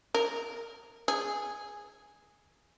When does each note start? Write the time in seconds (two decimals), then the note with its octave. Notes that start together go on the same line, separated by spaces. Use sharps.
0.14 A#4
1.08 G#4